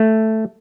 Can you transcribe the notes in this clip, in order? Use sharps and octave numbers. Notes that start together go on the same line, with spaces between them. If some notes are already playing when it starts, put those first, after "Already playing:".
Already playing: A3